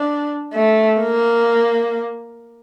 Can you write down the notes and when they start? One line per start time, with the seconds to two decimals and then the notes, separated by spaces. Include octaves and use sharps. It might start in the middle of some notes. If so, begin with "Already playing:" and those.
Already playing: D4
0.54 A3
1.01 A#3